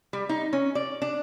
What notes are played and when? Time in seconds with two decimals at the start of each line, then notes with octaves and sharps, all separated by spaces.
0.13 G3
0.29 D#4
0.53 C#4
0.75 D5
1.02 D4